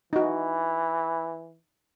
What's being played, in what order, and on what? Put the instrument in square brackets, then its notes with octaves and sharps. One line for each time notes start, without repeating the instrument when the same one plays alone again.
[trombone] E3 [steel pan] D#4 F#4